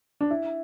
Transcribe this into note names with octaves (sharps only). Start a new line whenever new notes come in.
D4
E4